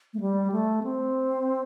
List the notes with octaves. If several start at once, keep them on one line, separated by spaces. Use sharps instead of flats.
A3
G3
A3
C4